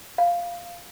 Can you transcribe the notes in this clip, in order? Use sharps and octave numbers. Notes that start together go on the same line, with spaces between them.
F5